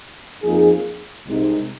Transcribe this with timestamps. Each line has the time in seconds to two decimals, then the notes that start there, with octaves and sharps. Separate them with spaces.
0.43 F2 F3 A#3 D#4 G#4
1.27 C2 C3 G#3 D#4